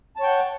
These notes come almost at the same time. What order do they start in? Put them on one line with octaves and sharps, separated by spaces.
A5 C#5 G5 F#5